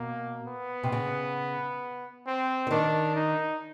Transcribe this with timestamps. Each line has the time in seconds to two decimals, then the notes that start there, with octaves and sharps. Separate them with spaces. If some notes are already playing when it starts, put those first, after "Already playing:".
Already playing: B2 A#3
0.47 B3
0.83 C3
0.92 C#3
2.27 C4
2.67 E3
2.71 D#3 D4
3.16 D#4